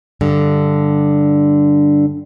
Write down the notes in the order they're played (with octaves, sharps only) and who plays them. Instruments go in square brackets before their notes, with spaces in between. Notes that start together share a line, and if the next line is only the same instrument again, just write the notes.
[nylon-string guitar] G2 D3